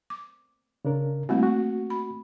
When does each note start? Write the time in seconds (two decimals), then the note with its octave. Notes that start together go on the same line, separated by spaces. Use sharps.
0.10 D6
0.85 C#3 D4 A#4
1.29 G3 A3 A#3 C4 E4 F#4
1.43 F#4
1.90 B5